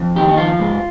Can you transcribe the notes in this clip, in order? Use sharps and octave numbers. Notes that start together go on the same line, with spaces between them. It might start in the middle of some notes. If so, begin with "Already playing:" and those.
Already playing: F2
D#3 G4
D#4
F3 F4
G#2